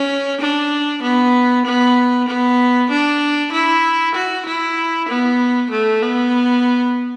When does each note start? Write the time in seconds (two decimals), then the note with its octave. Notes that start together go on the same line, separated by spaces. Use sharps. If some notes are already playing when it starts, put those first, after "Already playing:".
Already playing: C#4
0.41 D4
1.03 B3
1.66 B3
2.28 B3
2.90 D4
3.52 E4
4.15 F#4
4.46 E4
5.09 B3
5.71 A3
6.02 B3